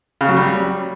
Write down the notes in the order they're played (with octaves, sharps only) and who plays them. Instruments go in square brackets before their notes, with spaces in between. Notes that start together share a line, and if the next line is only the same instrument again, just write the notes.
[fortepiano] C#3
F#3
G3